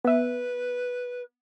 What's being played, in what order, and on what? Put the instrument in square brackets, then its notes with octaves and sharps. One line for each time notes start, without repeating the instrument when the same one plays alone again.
[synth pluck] B3 E5 [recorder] B4